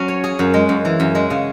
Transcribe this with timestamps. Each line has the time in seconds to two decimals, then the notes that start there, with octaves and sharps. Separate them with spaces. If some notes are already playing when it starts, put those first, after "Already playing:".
Already playing: F#3 C#4
0.08 C#5
0.24 G#4
0.39 F#2
0.54 G#3
0.69 F#2
0.85 E3
1.00 F#2
1.15 G#3
1.30 C#3